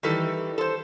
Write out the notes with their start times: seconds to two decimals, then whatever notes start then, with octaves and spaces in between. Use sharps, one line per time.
0.03 D#3 E3 G3 A4
0.58 A4 C5